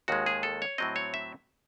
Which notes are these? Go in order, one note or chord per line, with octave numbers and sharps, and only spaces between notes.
D#2 D#3 G#3 F#4
G#4
A4
C#5
A2 F#3 C4 D#5
C#5
E5